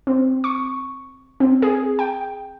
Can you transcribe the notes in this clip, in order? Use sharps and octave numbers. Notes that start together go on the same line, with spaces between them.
C4
C#6
C4
G#4
G5